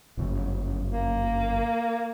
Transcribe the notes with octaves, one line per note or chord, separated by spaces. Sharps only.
G1 F#2 C#3
A#3